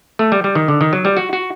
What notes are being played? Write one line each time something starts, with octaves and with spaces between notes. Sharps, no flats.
A3
G3
G3
D#3
D3
D#3
F#3
G3
F#4
F#4